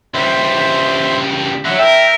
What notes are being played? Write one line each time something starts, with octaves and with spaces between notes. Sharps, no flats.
C#2 G3 C5 E5 C6
D3 F#3 E5 F#5
A4 A#4 E5 G5